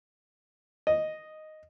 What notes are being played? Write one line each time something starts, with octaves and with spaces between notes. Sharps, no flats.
D#5